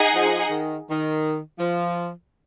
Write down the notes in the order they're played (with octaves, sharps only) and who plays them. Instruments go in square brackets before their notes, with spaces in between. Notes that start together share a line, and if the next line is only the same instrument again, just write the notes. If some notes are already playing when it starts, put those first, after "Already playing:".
Already playing: [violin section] D#4 G#4 D#5 F#5
[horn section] F3
D#3
D#3
F3